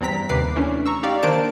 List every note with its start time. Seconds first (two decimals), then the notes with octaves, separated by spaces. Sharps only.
0.01 E2 G2 C4 A#5 B6
0.29 D#2 C3 B4 D6 C7
0.56 E3 A3 C#4 D4
0.86 A#5 C#6 E6
1.03 D#4 G4 D5 F5
1.23 D#3 A#3 D4 C5 A5 D7